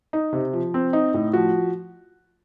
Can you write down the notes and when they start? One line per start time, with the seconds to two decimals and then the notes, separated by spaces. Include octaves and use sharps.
0.13 D#4
0.33 C3
0.53 F3
0.74 C4
0.93 D#4
1.14 A2
1.33 F3 F#4